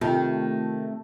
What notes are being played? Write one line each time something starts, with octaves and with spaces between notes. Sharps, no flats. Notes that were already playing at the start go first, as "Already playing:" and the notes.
C3 D#3 A3 F4